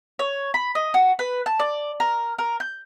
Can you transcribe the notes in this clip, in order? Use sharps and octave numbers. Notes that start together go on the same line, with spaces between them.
C#5
B5
D#5
F#4
B4
A5
D5
A#4
A#4
G6